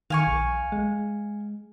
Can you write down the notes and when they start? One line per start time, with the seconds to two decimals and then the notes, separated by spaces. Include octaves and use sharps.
0.10 D#3 F5 G#5 C#6
0.27 A#1
0.72 G#3